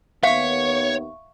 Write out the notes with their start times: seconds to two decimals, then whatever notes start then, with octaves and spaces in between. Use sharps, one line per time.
0.23 D#2 B3 C#5 E5 F5 C#6